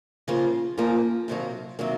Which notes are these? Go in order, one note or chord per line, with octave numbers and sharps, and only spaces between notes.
C#3 F3 A#3 F4
C#3 F3 A#3 F4
F2 C3 D#3 F#3 A#3
C3 D#3 F#3 A#3